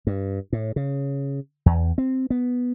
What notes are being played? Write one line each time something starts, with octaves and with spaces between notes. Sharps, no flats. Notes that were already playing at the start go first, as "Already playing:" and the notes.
G2
A2
C#3
E2
C4
B3